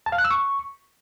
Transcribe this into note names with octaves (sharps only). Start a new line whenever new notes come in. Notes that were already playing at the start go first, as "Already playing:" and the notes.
A5
F5
F#6
E6
C#6